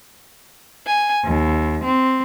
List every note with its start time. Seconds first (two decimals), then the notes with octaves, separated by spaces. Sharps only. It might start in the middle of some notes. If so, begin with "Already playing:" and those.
0.85 G#5
1.24 D#2
1.84 C4